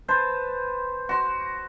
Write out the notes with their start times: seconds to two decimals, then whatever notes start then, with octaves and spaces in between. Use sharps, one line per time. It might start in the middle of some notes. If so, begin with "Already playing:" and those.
0.08 B4 C5 A5
1.09 F#4 C6